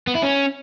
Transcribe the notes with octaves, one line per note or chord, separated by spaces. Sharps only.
B3
E4
C#4